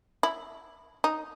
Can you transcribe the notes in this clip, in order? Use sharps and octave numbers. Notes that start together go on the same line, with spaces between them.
E4
D#4